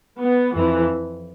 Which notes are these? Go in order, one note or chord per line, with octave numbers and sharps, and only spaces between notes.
B3
F2 E3